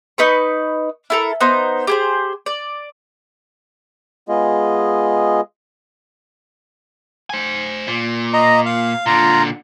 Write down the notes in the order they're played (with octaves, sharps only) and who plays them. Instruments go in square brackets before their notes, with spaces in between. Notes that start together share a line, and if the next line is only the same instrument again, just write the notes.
[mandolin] D#4 B4 C#6
E4 A4 A#4
B3 D#4 C5
G4 G#4 C5
D5
[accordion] G#3 B3 F4 G#4 D#5
[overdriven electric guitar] C5 G#5
A#2
[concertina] D#5 A#5
F5
[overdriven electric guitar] A#2 D3 [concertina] F4 A#5